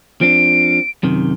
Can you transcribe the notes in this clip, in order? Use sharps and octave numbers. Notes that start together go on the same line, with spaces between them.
F3 C4 D4 D7
F#2 C3 D#3